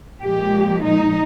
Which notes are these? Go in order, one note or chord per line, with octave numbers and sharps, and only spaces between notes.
A#2 F3 G#3 G4
D#4